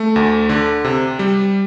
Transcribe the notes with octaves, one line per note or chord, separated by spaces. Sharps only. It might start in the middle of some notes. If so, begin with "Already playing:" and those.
Already playing: A3
D2
D3
C3
G3